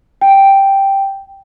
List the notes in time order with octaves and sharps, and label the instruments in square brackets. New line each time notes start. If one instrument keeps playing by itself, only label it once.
[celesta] G5